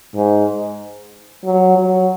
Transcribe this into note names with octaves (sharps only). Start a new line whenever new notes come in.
G#2
F#3
F#3